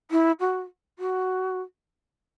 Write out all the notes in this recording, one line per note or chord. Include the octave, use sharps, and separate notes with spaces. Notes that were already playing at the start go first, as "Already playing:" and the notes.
E4
F#4
F#4